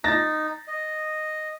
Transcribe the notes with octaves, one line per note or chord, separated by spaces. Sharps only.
D#4 A6 A#6
D#5